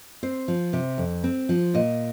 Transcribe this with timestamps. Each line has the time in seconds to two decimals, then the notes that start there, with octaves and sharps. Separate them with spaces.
0.23 C4 C5
0.48 F3
0.73 C3
0.98 F2
1.24 C4
1.49 F3
1.74 A#2 D#5